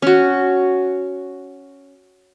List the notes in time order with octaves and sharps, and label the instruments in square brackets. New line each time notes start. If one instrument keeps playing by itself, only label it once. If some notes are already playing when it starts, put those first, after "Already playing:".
[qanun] C#4 F#4